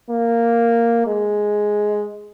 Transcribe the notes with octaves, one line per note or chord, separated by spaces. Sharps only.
A#3
G#3